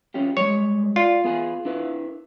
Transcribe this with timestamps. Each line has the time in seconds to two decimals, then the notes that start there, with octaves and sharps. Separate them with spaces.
0.14 C#4 F4 G4
0.37 G3 G#3 C#5
0.96 F4 D5
1.24 B3 G#4 G#5
1.65 D4 E4 B4